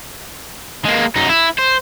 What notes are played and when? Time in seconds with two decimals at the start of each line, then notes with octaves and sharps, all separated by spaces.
0.85 G#3 A#3
1.16 F#2 D#4
1.29 E4
1.58 C5